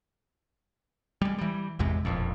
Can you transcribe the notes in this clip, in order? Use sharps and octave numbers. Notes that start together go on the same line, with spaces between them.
G3 G#3
E3 G3
G#1 E2 C3 G#3
E1 A#1 F2